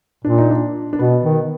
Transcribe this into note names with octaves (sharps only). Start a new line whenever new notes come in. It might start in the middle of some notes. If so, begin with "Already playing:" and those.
A#2 D4
D#4
D4
D4
B2 B3
D#3